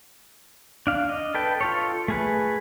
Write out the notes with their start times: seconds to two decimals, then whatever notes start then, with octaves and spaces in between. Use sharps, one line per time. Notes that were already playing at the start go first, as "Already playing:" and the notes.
0.87 D4 F5
1.09 D#5
1.35 A4 B4 G5
1.61 F4 A4 C#5
2.08 A3 G#4 B4